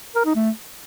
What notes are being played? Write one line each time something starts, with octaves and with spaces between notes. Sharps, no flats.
A#4
D#4
A3